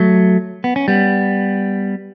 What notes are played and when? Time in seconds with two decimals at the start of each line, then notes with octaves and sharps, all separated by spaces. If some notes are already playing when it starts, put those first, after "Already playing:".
Already playing: F#3 A3
0.64 B3
0.76 C#4
0.88 G3 B3